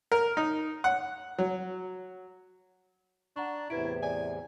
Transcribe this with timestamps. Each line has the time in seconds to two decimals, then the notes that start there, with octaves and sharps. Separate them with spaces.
0.12 A#4
0.37 D#4
0.84 F#5
1.38 F#3
3.36 D4 F#5 A#5 C#6
3.70 E2 A2 C3 E4 B4 G#6 D7
4.03 D5 G#5